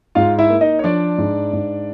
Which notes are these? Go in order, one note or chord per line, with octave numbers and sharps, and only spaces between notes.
G#2 F4 F5
E4 E5
A#3
D#4 D#5
C#5
F3 D4 D5
G#2
G#2